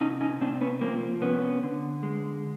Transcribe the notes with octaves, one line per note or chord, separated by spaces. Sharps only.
C3 C#4 D#4
C#4 D#4
C3 C4 D4
B3 C#4
F3 A#3 C4
C3 B3 C#4
D3
G#3